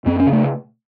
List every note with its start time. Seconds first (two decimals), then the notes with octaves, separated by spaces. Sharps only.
0.06 F#2 C4
0.20 C#4
0.26 C#3
0.33 A3